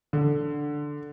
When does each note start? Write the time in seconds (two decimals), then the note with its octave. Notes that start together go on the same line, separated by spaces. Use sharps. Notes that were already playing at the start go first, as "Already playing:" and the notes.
0.13 D3